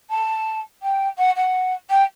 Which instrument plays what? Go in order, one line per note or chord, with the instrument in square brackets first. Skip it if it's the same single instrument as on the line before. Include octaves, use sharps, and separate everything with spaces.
[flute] A5
G5
F#5
F#5
G5